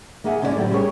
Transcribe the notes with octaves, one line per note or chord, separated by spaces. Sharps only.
A#3 G#4 E5 F#5 G#5
G#2 D3 C#4 E4 A4 D5
A2 F#3 C4 G4
G3 C#4 E4 G#4 A#4 C#5